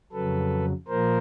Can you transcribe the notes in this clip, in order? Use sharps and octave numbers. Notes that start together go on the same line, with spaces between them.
F2 C#3 F#3 A4 B4
A#2 F3 A#3 A#4 C5